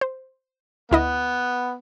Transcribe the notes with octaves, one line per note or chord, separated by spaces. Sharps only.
C5
D2 B3 E4 D#5